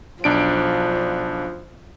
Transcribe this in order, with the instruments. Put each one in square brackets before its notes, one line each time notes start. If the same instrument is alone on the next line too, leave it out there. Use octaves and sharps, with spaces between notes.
[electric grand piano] B1 D4 D7 [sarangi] F3